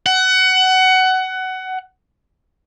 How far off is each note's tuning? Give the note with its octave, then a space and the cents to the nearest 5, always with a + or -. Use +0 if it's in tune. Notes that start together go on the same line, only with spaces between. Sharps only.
F#5 +20